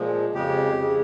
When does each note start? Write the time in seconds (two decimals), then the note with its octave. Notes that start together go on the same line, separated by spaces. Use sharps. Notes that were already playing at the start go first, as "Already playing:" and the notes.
Already playing: A#2 F3 G#3
0.34 F2 C#3 G#3 G4
0.77 F2 C#3 G#3